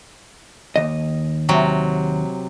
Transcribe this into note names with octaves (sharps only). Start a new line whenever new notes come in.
D#2 D#5
C3 F#3